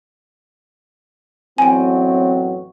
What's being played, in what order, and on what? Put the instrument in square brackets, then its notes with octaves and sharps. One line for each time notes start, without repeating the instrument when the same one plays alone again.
[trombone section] A1 E2 F#3 [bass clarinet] C4 [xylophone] G5 G#5